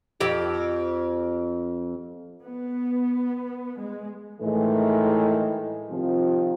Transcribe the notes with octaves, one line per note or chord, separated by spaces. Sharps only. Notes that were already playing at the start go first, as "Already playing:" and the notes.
F2 G4
B3
G#3
A2 D#3 E3 G#3
C3 D#3 F3